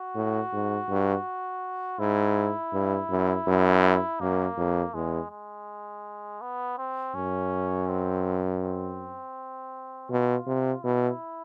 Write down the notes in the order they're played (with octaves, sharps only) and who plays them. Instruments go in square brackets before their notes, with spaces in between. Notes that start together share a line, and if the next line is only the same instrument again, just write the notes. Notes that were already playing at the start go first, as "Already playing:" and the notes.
Already playing: [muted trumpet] F#4
[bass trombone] A2
G#2
G2
[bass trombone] G#2 [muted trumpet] E4
[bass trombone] G2
F#2
F#2
[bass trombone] F#2 [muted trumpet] A#3
[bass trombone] F2
[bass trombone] E2 [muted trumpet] G#3
[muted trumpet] G#3
B3
C4
[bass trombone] F#2 [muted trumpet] C#4
[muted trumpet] C4
C4
[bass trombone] B2 [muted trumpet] F4
[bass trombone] C3
[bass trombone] B2 [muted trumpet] E4